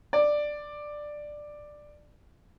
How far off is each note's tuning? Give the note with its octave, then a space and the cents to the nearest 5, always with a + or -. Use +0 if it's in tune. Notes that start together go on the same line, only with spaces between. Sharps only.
D5 +10